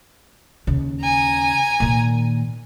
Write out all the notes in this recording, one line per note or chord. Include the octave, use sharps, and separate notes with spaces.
D#2 C#3
G#5 A#5
A#2 D#3